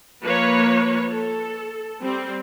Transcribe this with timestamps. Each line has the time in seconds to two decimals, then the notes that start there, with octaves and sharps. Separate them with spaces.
0.23 F3 A#3 B4 C#5
1.10 A4
2.02 G3 C4